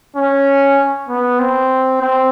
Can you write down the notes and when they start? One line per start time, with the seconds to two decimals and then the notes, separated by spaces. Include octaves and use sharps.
0.16 C#4
1.08 B3
1.39 C4
2.01 C4